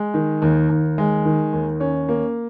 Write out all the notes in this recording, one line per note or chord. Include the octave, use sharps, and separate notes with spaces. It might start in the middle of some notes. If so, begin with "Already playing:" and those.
Already playing: G#3
D#3
D#2
D#2
G#3
D#3
D#2
C#4
A#3